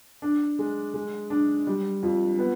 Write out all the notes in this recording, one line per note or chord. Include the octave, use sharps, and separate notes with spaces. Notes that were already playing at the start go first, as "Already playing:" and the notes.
D4
G#3
G#3
D4
G3
F2
B3